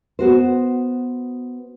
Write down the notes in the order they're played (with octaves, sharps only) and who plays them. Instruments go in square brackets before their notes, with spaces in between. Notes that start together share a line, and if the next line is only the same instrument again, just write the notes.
[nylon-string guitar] B3 F#4 C5